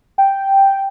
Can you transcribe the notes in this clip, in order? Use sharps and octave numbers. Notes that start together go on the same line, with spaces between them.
G5